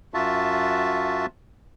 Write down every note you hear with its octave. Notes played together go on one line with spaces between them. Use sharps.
F#2 F4 F#4 E5 A5